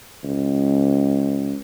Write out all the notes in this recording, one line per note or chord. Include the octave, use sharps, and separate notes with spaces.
C#2